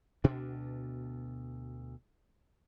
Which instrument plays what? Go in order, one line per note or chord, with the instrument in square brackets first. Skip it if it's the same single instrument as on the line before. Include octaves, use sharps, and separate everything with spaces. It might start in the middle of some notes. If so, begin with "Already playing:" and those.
[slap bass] D2 B2 D4